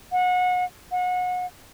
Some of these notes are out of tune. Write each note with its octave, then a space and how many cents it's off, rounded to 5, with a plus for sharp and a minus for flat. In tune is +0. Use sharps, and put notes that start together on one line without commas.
F#5 -30
F#5 -30